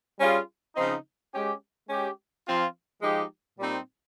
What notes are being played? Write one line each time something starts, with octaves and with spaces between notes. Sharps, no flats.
G3 C#4 F4 G#4
C#3 F3 C4 D#4
G#3 C#4 G4
G#3 C#4 G4
F3 C4 F4
F3 G#3 D#4 G4
A#2 G3 C4 D#4